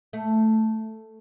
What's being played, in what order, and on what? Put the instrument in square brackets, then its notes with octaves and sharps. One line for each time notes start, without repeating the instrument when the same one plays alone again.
[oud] A3